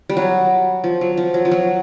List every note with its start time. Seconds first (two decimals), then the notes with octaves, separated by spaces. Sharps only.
0.09 G3
0.17 F#3
0.84 F3
1.01 F#3
1.17 F3
1.34 F#3
1.45 F3
1.51 F#3